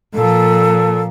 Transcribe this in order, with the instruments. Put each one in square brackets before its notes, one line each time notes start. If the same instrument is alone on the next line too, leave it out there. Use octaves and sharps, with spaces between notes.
[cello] A#2 F3 [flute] A4